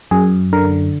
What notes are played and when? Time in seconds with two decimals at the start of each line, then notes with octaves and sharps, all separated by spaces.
0.11 F#2 G#4
0.53 D3 A#4